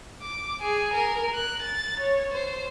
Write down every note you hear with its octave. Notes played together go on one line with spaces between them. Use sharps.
D6
G#4
A#4
F#6
A6
C#5
C5